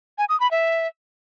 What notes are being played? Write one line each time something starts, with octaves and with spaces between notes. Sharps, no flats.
G#5
D#6
B5
E5